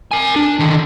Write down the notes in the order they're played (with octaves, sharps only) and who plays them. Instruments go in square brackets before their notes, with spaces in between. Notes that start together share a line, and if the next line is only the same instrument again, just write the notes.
[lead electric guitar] A#4 G#5
D4
D3 D#3